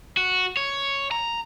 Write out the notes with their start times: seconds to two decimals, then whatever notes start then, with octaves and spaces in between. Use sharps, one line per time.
0.17 F#4
0.57 C#5
1.11 A#5